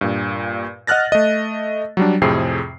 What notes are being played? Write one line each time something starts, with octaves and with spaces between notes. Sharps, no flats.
G2 A#2
D#5 F#5 F6 F#6 A6 A#6
A3 D#5
F#3 G3 D4
F2 A2 C3 C4 G#4 C7